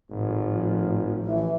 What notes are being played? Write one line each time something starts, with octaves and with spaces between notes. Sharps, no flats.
G#1 A2 F3
A1 E3